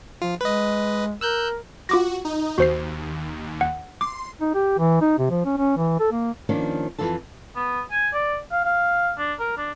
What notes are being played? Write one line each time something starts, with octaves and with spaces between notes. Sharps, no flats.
F3 F4
G#3 B4 D#5
A#4 E6 F#6 G6
F4 F#4 D6 A#6
D#4
D#2 F#4 C5 C7
F#5
C6 D6
D#4
G4
E3
D#4
C3
F3
C#4
C#4
E3
A4
A#3
D#3 F3 A#3 C#4 D4
F2 G#2 E3 F4 A4 A5
B3
G#5
D5
F5
F5
D4
A#4
D4